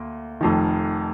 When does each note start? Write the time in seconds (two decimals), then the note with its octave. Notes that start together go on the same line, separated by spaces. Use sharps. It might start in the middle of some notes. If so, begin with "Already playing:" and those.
Already playing: D2 A#3
0.41 F1 F2 D#3